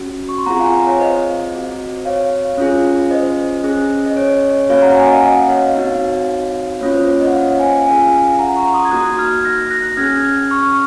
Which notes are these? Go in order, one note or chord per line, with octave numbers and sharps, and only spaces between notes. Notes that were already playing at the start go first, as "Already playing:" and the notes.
Already playing: C#4 F#4
C#6
C6
C4 F4 G#4 F#5 A#5
F5 G#5
C#5 F5
C5 D#5
C4 F#4
C#5 F5
C#4 F4 G#4
C5 D#5
C#4 G#4
D#5
C#5
C#5
A#3 C#4 F#4 C#5 F5
F#5 A#5
F5 G#5
D#5 F#5
D#5 F#5
C#5 F5
C4 D#4 F#4
A#3 C#4 F4 C#5
C5
C#5
C5 D#5
F#5
C#5 F5
F5 G#5
C#4 F4 G#4 F5 G#5
F#5 A#5
A#5 C#6
C6 D#6
G#6
A#3 D#4 F#4 D#6 F#6
F6 G#6
F#6 A#6
F#6 A#6
F#6
C#4 G#4 F6 G#6
C#6 F6